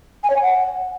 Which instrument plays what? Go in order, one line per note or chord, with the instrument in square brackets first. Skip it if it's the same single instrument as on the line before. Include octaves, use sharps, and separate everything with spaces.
[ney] G#5
C#5
G#5
F#5